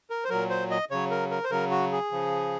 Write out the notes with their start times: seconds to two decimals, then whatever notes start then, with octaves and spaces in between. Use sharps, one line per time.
0.10 A#4
0.24 C5
0.29 A#2 F#3 A#4
0.50 C5
0.71 D#5
0.91 C#3 F#3 C#5
1.11 A#4
1.31 A#4
1.44 C5
1.51 C#3 F#3 A#4
1.71 F#4
1.92 G#4
2.11 C#3 F3